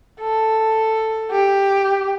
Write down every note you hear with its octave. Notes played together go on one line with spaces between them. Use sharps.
A4
G4